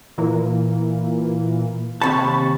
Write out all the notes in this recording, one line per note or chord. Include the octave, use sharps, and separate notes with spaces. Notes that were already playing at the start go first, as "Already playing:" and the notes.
A#2 E3 A#3
D#2 C3 A5 B5 C#6